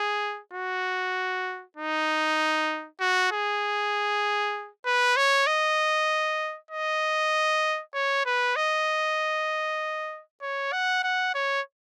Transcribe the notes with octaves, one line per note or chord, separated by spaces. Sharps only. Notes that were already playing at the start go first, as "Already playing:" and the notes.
Already playing: G#4
F#4
D#4
F#4
G#4
B4
C#5
D#5
D#5
C#5
B4
D#5
C#5
F#5
F#5
C#5